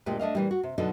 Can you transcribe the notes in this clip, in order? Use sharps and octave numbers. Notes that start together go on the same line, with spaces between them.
D2 A#2 G#3 G4
A3 D4 D#5 F5
A#2 E3 G3
F#4
C3
B2 D3 F#3 D4 D#4 A4